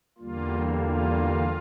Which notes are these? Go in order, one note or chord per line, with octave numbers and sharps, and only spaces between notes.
E2 D3 G3 A#3 F4
F4